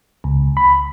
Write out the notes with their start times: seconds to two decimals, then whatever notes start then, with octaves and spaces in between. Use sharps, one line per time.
0.24 C#2
0.57 B5